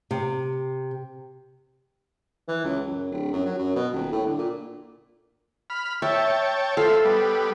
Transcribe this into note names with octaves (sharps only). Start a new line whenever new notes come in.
C3
E3
C#2
F#2
D1
F#2
F#3
F#2
B2
D#1
A2
D3
A#2
B5 F6
C#5 E5 G5 A5
F4 A4 C5 E5
G3 B3